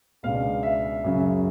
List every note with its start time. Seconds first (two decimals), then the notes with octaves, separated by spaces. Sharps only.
0.23 C#2 B2 G#3 B3 D4 F5
0.63 E5
1.04 F#2 C#3 F#3